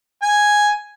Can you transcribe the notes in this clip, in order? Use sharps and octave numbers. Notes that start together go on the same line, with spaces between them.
G#5